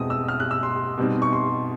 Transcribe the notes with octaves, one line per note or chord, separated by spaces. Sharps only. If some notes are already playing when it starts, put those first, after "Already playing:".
Already playing: E2 B2 G#3 C4 D#6
E6
F6
F#6
E6
C6
B2 G3 C4 D#4
C#6
C6